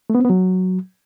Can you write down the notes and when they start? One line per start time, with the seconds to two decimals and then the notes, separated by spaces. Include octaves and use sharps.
0.10 A3
0.15 B3
0.20 C4
0.25 B3
0.30 F#3